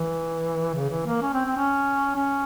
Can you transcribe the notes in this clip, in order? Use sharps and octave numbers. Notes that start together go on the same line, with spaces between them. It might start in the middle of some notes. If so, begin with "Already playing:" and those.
Already playing: E3
C#3
E3
A#3
C#4
C4
C4
C#4
C#4